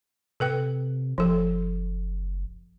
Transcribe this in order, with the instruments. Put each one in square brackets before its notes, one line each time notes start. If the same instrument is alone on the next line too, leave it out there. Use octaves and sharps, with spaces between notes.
[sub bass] C3 [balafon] A4 B4 G5
[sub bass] F#1 [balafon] F3 A4